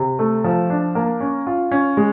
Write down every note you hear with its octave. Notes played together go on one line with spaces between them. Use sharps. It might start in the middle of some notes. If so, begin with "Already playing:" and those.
Already playing: C3
A3
F3
D4
A#3
C#4
F4
C#4
G#3